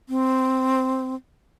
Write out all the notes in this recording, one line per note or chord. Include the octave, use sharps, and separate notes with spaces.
C4